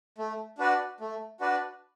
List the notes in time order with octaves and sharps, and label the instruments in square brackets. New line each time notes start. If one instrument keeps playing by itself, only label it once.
[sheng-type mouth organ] A3
D4 F#4 B4 D5
A3
D4 F#4 B4 D5